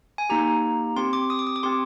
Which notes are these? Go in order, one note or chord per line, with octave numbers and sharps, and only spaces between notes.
G#5
A#3 D#4 G4 A#5
C4 G4 C6
D6
D#6
D6
D#6
D6
C4 G4 C6